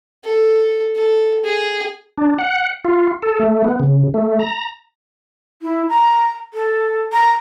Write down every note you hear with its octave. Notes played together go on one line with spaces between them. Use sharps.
A4
A4
G#4
D4
F#5
F4
A4
A3
B3
C#3
A3
A#5
E4
A#5
A4
A#5